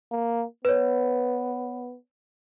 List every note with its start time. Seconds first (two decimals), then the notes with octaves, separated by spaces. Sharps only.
0.12 A#3
0.65 B3 B4 C#5